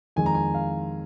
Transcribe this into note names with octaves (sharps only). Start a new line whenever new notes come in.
F2 D#3 G#3 G#5
A#5
G#5
F5